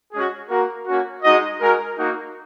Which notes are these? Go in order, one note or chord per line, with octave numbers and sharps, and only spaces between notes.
G#3 C#4 F#4 G#4
A#3 F#4 A#4
A#3 C#4 F#4
G#3 D#4 F#4 D#5
G#3 F#4 A#4
A#3 D#4 F#4